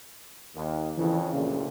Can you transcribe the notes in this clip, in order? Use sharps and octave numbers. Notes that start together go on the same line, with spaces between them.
D#2
F2 C#3 E3
D2 A#2 C#3